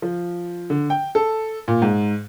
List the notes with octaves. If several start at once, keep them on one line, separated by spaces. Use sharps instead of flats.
F3
D3
G5
A4
A#2
G#2